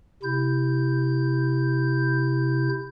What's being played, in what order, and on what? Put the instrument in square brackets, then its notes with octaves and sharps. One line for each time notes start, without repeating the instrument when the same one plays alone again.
[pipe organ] C3 E4 G6